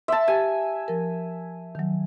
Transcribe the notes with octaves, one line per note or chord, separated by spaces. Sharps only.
E5 A5 C6
G4 G#5
F3 A#4
D#3 F#3